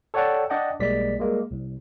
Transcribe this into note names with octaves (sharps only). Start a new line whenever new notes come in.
A4 C#5 D5 F#5 G5 A5
D4 D5 D#5 F#5 G5
B1 G3 G#3 A#3 D5 B6
G3 G#3 A#3
C2